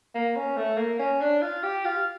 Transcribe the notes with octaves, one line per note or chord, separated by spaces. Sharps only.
A#3
C#4
A3
A#3
C#4
D4
F4
G4
F4